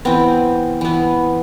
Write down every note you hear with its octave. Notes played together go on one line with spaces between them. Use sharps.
E3 B3 C4
E3 B3